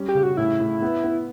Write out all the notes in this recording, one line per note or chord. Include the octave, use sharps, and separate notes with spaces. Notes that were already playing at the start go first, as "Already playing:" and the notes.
Already playing: G3 C#4
G4
C#3
F#4
A2 E4
A2
B3
B3